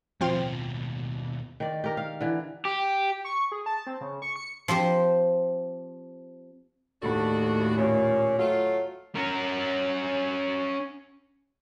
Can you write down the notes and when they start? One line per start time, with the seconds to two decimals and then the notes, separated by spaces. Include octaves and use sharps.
0.21 D#2 B2 F3 C4 F4
1.60 D#3 D5
1.84 G4 A#4
1.97 F5
2.21 D3 E3
2.65 G4
3.25 C#6
3.52 G#4
3.66 A5
3.87 C4
4.01 C#3
4.22 C#6
4.36 C#7
4.68 F3 C4 G4 C5
7.02 D#2 A2 D4 F#4 A4
7.77 A#2 C#4
8.38 F#3 A3 F4
9.16 C#4 A#4